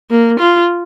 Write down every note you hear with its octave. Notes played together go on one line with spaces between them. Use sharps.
A#3
F4